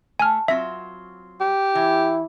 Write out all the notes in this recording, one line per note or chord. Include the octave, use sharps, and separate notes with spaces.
A3 G#5 F6
F#3 C4 F4 E5
G4
E3 E4